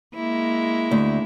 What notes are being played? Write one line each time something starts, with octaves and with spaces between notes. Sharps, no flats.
G#3 A#3 E4
D2